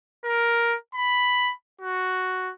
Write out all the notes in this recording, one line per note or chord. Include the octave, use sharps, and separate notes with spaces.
A#4
B5
F#4